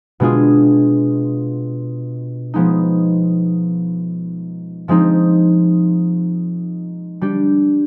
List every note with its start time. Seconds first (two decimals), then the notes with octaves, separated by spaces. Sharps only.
0.20 B2 G#3 D4 F4 G#4
2.54 F3 G#3 B3 D#4
4.88 F3 G#3 C4 D#4
7.21 G3 D4 G4